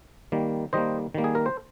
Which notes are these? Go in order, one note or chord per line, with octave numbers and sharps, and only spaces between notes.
D#3 G3 A#3
D#3 G3 A#3 C5 D#5
D#3 G3 A#3
G#4
A#4
C5